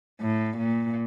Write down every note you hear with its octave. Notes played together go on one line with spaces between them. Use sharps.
A2
A#2